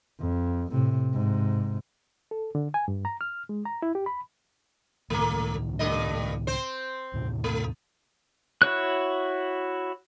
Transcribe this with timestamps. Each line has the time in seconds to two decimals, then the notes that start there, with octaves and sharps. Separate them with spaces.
0.20 F2
0.71 A2 C3
1.13 G#2 C3
2.31 A4
2.55 D3
2.74 G#5
2.88 G2
3.05 A#5
3.21 F6
3.49 G#3
3.65 A#5
3.82 E4
3.95 G4
4.06 B5
5.10 C#2 A2 D#3 A3 A#3
5.79 G2 A3 D#5
6.47 C4 C5
7.13 D#2 A2 C3
7.44 A3
8.62 E4 F#4 C#5 F#6